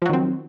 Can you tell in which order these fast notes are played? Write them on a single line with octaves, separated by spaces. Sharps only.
F3 F#3 D#3 C4